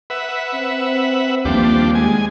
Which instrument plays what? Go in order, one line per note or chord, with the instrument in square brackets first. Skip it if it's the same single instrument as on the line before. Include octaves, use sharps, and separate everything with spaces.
[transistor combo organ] B4 E5 F#5
[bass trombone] C4
[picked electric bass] D#2 G3 A#3 [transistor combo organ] F3 D4 G4
[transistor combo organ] G#3 G#5